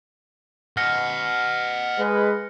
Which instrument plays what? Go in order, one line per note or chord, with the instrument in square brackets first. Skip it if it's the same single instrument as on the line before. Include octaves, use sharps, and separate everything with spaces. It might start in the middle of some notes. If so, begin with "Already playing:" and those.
[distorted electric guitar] D#5 F#5 [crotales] F6 A#6 C#7
[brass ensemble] G#3 B4